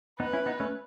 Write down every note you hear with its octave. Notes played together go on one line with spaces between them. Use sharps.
B3 D#4 B4
C#4 E4
B3 D#4
A3 C#4